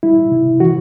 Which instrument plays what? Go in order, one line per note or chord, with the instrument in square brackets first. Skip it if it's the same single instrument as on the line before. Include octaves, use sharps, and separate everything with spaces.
[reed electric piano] G3 E4
C3
E3 F#4